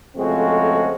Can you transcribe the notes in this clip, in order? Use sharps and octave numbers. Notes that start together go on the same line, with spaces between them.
F2 C#3 G#3 A3 C4 F#4